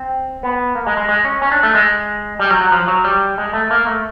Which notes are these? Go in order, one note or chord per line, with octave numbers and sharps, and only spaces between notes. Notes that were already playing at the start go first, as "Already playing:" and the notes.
Already playing: C4
B3
A#3
G#3
G#3
G#3
C#4
C#4
D4
A3
G#3
G3
F#3
F#3
F3
F#3
G3
G#3
A3
A#3
A3